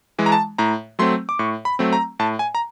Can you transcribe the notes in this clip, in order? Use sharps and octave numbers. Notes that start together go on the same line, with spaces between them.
E3 G#3
A#5
A5
A2 A#5
F#3 A3 C4 C6
D6
A2 C#6
B5
F#3 A3 C4
A#5
A2 A5
G#5
A#5